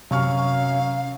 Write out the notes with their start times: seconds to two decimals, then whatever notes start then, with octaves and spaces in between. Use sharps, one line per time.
0.11 F#2 C3 C#4 F5 C#6 F6